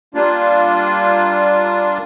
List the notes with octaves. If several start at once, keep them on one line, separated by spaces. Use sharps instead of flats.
G3 A#3 D4 F4